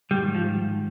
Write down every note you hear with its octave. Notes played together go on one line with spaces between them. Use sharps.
G#2 D#3 G3
F3